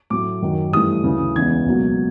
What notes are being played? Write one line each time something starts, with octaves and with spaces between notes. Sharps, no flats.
A2 F#3 A3 D6
F#2 D#3 F#3
G2 E3 A3 D#6
D2 C#3 E3
E2 C#3 E3 G#3 G#6
C#2 B2 F#3 A#3